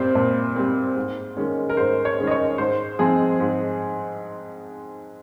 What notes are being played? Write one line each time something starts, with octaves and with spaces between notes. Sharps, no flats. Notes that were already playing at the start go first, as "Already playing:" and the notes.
Already playing: A#2 G3 C4 C5
A#2
G3 C4
G#2
D#3 G#3 C#4
A#4
G#2 C5
C#5
D#3 G#3 C#4
D#5
C#5
G#2 C5
F3 G#3 C4 G#4
G#2